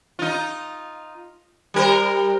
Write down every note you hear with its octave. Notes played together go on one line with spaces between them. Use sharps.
D#4 F4
G3 A#4 C5